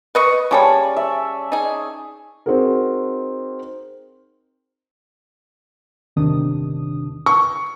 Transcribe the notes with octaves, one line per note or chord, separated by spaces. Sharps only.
B4 D#5 C#6
C#3 G3 C#4 C#5 D5 A5
E5
D#4 G#4
C4 D#4 F#4 G#4 A#4
G1 E2 C3 D#3 D4 D#6
C#6